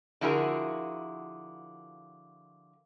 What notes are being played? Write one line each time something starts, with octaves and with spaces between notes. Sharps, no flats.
D3 F3 E4 F#4 G#4 A#4